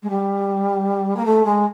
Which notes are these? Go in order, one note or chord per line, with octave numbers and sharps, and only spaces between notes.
G#3
G3
A#3
A3
G#3